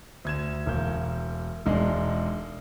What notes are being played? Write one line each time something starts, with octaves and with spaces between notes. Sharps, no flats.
D2 G#6 E7
E1 A#3 G6
E1 G#3 D4 D#4